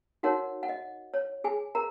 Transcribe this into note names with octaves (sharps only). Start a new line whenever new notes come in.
D#4 F#4 A#4 C#5 F#5
F#5
D#5
C#5
G#4 G#5
A#4 A#5